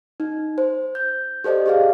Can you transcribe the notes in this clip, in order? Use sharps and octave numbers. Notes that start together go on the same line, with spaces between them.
D#4
C5
G6
G4 A4 C5 D5 D#5
G4 G#4 D5 F5